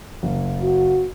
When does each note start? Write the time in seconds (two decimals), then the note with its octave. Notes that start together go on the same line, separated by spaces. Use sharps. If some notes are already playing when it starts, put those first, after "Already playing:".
0.23 F#1
0.61 F#4